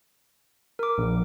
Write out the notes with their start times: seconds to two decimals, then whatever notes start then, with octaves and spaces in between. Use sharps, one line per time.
0.79 A#4 D6
0.98 A#1